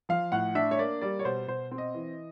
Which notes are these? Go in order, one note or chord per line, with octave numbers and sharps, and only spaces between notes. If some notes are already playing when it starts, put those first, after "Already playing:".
F3 F5
A2 F#5
D4 E5
C#5
A#3 D5
G3 D5
C#5
B2 C5
B2 C5
C4
D#5
E3